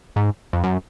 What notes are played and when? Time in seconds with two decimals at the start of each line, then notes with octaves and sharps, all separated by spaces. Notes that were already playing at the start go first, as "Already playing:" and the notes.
0.16 G#2
0.53 F2
0.64 F#2